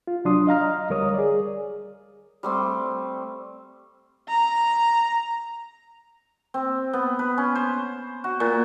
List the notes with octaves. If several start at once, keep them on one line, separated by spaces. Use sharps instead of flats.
F4
C2 F#3 D4 C6 D#6
D#5 F5 A#5 F6
D2 G3 A#4 C#5 D#6
G#4 D5
G3 A3 C4
A#5
C4
B3
B4
C#4
C5
F#4
A#2